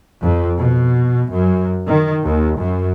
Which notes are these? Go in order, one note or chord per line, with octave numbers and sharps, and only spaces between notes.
F2
B2
F#2
D#3
D#2
F#2